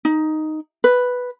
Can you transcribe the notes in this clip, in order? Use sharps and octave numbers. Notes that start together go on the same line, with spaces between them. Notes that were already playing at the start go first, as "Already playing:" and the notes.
D#4
B4